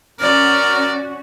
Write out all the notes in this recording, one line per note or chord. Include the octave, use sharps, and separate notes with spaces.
C#4 F#4 A#4 D5